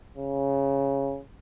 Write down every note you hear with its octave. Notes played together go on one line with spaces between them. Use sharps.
C#3